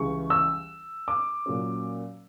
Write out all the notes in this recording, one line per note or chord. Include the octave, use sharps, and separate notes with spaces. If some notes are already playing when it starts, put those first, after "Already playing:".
Already playing: C#2 C#3 E3 G3 C#6
E6
D6
A#2 F#3 C#4